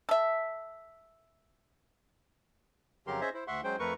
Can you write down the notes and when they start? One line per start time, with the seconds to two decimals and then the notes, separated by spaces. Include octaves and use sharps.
0.09 A4 E5
3.07 F2 C#3 F#3 G4 A#4 C6
3.21 C#4 G#4 C5 D#5 E5
3.34 E4 C5
3.47 D2 E5 F#5 C6 C#6
3.64 F#3 G#3 C#4 C5 G5
3.79 F2 A3 A#4 B4 C#6